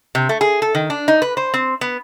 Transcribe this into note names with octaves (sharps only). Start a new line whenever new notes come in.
C3
A3
G#4
A4
D#3
D4
D#4
B4
C5
C4
B3